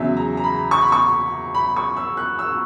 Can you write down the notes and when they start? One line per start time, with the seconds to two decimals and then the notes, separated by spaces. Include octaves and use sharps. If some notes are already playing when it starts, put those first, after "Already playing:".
Already playing: E2 C#3 F#3 E5
0.17 A#5
0.37 A#5
0.44 B5
0.71 C#6
0.82 B5
0.92 C#6
1.55 B5
1.76 C#6
1.97 E6
2.17 F#6
2.39 E6